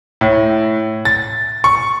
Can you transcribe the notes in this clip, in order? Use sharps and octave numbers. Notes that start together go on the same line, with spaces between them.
A2
A6
C#6